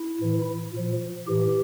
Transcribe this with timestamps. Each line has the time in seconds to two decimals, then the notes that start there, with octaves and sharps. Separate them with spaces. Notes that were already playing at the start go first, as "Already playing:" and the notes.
Already playing: E4
0.20 A2 E3
0.73 A#2 F3
1.27 A2 E3 G4